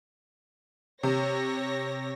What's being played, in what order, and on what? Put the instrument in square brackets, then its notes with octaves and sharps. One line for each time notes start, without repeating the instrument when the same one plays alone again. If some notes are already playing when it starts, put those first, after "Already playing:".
[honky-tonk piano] C3 [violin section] C#5 A#6